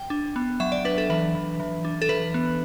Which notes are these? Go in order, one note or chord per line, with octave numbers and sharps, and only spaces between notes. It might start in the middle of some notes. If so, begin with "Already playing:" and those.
Already playing: G5
D4
B3
F#3 E5
D5
D4 B4
A4
E3 B4
E3
E3
D4
A4
E3 B4
B3